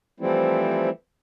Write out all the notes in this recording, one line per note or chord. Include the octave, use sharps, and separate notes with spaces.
E3 F3 G3 A3 C4 E4